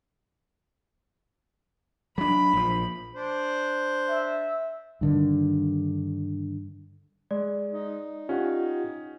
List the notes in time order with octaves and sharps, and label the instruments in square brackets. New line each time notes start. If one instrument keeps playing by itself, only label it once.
[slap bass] F#3 D4 [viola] B5
[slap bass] A#1 F3
[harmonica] D4 C5
[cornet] E5
[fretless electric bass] G2 D3 D#3
[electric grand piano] G#3 [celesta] D5
[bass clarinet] D#4
[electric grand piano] C#4 [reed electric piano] F4 G4 F#5